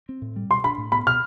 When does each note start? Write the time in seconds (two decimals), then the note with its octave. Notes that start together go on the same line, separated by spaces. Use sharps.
0.09 C4
0.22 A2
0.36 G3
0.51 B2 C6
0.64 D4 B5
0.78 A2
0.92 B3 B5
1.07 B2 F6